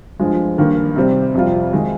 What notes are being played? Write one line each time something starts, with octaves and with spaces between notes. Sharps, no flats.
G2 F3 G#3
G2 D#3 A#3
C3 G3 C4
F2 C3 G3 C4 F4
D#3 G#3 C4